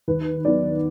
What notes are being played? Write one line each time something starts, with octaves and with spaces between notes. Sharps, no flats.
D#2 B4
D#3 F#3 B3 D#4 D5